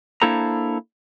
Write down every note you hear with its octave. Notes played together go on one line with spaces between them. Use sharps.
A#3 D4 E4 A4 C5 A#5